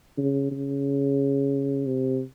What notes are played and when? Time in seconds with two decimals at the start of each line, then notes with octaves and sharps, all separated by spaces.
0.18 C#3
0.51 C#3
1.86 C3